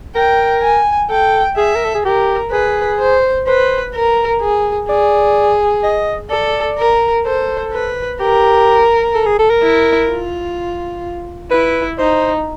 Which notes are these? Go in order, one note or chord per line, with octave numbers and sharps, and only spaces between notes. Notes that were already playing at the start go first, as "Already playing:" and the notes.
A#4 G5
G#5
A4 G5
G#4 E5
A#4
A4
G#4
G4 A#4
G#4 B4
C5
B4 C5
A#4
G#4
G#4 D5
D#5
A4 D5
A#4
A4 C5
B4
G4 A#4
A4
G#4
A4
A#4
E4
F4
E4 B4
D#4 C5